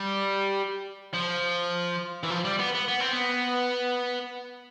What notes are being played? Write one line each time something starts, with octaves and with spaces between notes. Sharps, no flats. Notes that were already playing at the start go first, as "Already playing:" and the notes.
Already playing: G3
F3
E3
F3
G3
B3
B3
B3
C4
B3